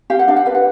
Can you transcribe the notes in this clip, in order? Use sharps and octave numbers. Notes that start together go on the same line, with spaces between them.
G4 F5
F#5
D4 F5
F#5
B4 F5
F#5